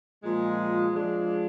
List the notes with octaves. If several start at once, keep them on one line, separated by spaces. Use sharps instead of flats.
A#2 F3 G#3
F3 G#3 D4